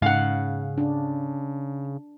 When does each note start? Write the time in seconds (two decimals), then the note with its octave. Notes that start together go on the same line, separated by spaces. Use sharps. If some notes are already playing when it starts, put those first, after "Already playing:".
0.02 G#2 C#3 F5 F#5
0.78 D4